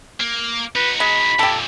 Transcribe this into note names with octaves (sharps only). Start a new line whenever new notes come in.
A#3
D#4 F#4 B4
G#3 B5
F2 A#2 G4 A4